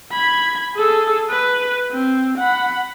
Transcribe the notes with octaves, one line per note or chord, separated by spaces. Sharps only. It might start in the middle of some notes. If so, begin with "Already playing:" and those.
B5 G#6
G#4 A4
B4
C4
F#5 B5